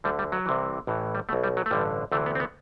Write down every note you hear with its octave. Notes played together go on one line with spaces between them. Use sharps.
D2 D3 G3
G3
F#3
C2 C3 E3
A1 A2 E3
G3
B1 B2 A3
G3
F#3
A3
A1 G2 D3 G3
D2 C3 E3 A3
B3
C4
B3